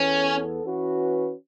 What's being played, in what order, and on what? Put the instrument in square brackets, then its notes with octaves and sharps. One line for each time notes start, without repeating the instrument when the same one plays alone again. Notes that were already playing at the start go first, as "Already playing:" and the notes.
Already playing: [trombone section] E2 E3 B3 A4 [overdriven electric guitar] C#4
[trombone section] E3 C#4 F#4 B4